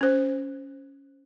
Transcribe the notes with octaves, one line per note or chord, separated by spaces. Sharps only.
C#4 C5